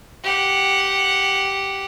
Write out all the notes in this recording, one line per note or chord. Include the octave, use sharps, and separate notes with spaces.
G4 F#5